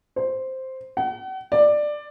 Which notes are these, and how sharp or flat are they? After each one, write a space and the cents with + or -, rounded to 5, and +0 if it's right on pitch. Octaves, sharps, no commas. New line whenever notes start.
C5 +0
F#5 +40
D5 +15